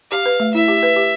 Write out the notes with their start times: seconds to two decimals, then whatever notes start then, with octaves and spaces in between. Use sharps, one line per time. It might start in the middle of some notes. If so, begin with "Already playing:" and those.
0.11 G4 F5
0.26 B4
0.40 A3
0.54 E4 E5
0.68 G4
0.83 B4
0.96 G4